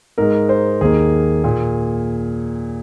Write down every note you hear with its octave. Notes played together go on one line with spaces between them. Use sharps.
G#2 G#3 A#4
C5
D#2 D#3 A#3 G#4
A#2 A#3